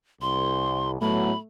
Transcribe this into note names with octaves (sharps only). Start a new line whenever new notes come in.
C2 C6
A2 F#3 A3 B3 B5